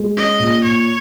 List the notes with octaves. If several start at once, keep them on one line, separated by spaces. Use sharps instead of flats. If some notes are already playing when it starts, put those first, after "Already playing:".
Already playing: G#3
C#4 D#5
A#2
A#2 C#5